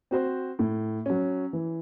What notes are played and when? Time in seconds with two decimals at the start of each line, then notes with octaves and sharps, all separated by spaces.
0.11 C4 F#4 C5
0.59 A2
1.06 F#3 C#4
1.53 E3